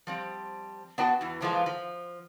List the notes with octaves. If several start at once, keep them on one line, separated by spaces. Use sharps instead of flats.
F3 G3 C4
B3 D4 F#4 G5 A5
E2 E3
A#2 E3 F3 G#3 A3 F4
F3